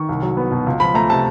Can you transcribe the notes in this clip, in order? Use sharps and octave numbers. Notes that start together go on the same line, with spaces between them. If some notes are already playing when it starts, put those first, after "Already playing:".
Already playing: D#3 C#6
C2
F#3
B3
B2
C#2
F3 B5
A3 A#5
C3 A5